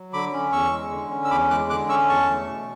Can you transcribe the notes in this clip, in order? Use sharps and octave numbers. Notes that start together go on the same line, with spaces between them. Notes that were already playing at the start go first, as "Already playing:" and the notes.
Already playing: F#3
D3 B5 D6
C#4
E2 C#6 E6
G#3
D3
C#4
E6
E2 B5 D6
G#3 D6 F#6
D3 D6 F#6
C#4 C#6 E6
E2 A5 C#6
A3
B2